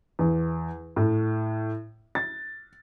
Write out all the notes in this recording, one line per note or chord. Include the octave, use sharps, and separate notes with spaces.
E2
A2
A6